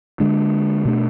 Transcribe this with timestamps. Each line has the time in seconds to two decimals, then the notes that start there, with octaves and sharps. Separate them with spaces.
0.20 D3 G#3 D4
0.85 B2 A3 D4